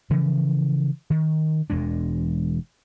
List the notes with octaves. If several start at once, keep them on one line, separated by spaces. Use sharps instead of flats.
C#3 E3 F3
D#3
E1 E2 G#3 D4